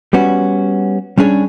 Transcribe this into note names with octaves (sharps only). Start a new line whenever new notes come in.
G3 B3 C#4 F#4
G3 C#4 D4 G#4 C#5